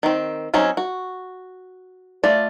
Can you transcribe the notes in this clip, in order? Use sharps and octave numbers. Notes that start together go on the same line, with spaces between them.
D#3 C4
F#3 C4 C#4 D#4
F#4
A3 F4 D5